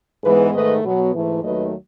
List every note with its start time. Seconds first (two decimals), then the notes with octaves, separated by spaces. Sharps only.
0.24 G#2 E3 G#3 B3 G#4 B4
0.54 G#2 D#3 A3 B4 D#5
0.84 B2 F#3 B3
1.13 G#2 E3 A3
1.44 D#2 D#3 F#3 A3 B4 D#5